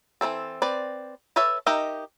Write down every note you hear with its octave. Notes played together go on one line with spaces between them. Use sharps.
E3 A#3 C4 A4
C4 B4 D5
A4 B4 C#5 E5
D#4 G4 A#4 D#5 E5